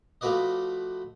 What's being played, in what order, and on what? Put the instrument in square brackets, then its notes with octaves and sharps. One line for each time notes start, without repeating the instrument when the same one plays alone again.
[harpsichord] F3 A3 F#4 B4 D5 D#5